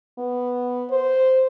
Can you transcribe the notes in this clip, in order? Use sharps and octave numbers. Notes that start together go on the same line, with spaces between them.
B3
C5